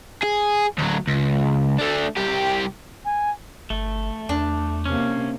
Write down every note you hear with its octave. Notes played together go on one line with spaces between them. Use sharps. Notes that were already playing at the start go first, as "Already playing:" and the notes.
G#4
D2 F#3
C#2
A3 D4
C2 G4
G#5
G1 A3
E2 D4
C3 A#3 C#4